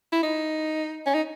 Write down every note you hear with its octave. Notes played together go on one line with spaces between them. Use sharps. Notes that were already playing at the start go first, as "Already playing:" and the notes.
E4
D#4
C#4
D#4